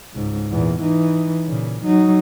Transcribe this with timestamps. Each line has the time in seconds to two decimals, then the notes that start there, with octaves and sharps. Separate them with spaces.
0.14 C#2 G#2
0.51 E2 A#2
0.80 E3 D#4
1.46 A#2 C#3
1.85 F#3 D#4